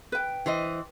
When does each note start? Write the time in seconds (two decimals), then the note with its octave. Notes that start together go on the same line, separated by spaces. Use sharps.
0.12 B4 G5
0.46 E3 C5 D#5